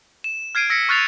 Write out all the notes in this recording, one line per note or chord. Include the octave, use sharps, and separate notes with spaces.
E7
F6 G#6 C7 D7 D#7
E6 A#6 B6 C#7
C#6 F6 F#6 A6 C7 F7